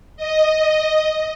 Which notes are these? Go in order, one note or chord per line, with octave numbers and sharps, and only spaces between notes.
D#5